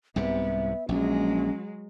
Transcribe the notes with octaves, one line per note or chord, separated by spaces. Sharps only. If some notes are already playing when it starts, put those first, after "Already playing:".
C2 G#2 C3 B3 E5
A#1 F#3 G#3 C#4